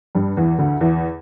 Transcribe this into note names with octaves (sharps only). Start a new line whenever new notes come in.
G2 G3
E2 E3
D2 D3
E2 E3